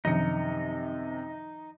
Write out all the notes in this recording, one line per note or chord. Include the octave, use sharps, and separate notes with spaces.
F#2 C3 D#3 F3 D4 D#4 C#7